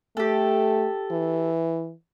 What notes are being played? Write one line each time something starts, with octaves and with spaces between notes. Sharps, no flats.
A3 G4 A4
E3